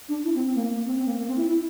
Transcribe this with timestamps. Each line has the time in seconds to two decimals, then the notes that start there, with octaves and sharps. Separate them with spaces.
0.09 D4
0.24 E4
0.35 C4
0.46 C4
0.55 A#3
0.70 A#3
0.86 C4
0.96 C4
1.06 A#3
1.17 A#3
1.28 C4
1.37 E4
1.48 E4